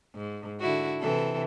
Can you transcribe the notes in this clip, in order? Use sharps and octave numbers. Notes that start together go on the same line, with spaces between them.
G#2
D3 E4 F#4
C3 E3 A4